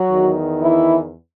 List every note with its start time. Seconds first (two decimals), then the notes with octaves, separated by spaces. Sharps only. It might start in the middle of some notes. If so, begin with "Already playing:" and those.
Already playing: F#3 F#4
0.11 E2 D#3
0.61 E3 E4